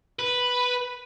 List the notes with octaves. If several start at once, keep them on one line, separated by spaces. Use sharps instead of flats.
B4